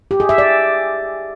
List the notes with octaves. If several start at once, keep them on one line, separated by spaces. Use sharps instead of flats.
G4
G#4
E5
D5